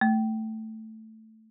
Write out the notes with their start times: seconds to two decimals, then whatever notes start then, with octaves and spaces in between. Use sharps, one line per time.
0.01 A3